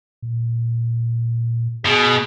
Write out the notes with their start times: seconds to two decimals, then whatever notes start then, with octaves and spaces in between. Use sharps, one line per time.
0.22 A#2
1.86 B2 G#4